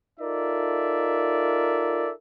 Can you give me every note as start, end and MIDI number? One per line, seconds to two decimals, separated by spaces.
0.20 2.12 63
0.20 2.12 65
0.20 2.12 69
0.20 2.12 70
0.20 2.12 74
0.20 2.12 76